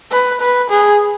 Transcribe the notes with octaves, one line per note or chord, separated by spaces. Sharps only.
B4
B4
G#4